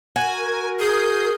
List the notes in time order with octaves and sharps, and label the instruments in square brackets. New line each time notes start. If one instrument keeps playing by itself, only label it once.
[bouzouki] F#4 [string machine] A#4 [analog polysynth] G#5
[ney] G#4 [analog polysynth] D#6 G6 C7